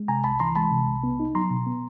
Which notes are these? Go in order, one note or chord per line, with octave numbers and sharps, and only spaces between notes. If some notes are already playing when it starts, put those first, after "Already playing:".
Already playing: G#3
C3 G#5 A#5
C2 A5 B5
E3 A#5 C6
G#3 A5 B5
C3
C2
B3
D#4
F#3 A#5 C6
B2
B3